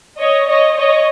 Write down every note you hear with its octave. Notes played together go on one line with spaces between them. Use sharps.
C#5 D#5
C#5 D#5
C#5 D#5